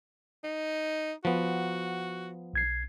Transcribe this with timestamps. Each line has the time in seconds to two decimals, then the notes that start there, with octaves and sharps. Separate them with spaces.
0.44 D#4
1.25 F3 B3 F#4
2.53 B1 G#6 C7